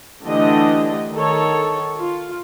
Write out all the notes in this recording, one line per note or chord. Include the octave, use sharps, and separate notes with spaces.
D3 E3 A3 D4 G4 D#5
D#3 A4 C#5
F4